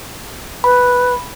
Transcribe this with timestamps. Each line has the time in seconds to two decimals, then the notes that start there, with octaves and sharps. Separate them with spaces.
0.64 B4 B5